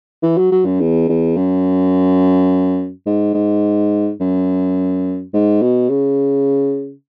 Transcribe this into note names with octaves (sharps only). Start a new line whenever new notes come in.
E3
F#3
F#3
F#2
E2
E2
F#2
G#2
G#2
F#2
G#2
B2
C#3